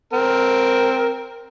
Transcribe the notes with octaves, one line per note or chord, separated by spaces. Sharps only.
C4 A#4